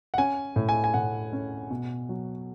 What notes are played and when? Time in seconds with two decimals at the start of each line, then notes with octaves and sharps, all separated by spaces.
0.14 F#5
0.18 C#4 G#5
0.56 A2
0.69 G#5
0.84 G#5
0.94 A2 F#5
1.33 C#4
1.70 B2
2.09 F#3